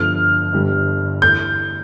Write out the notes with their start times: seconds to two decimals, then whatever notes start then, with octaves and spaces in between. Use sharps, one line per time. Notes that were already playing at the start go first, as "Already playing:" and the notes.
Already playing: G1 G2 F3 A3 F6
0.53 G1 G2 D3 G3
1.22 E3 A3 G6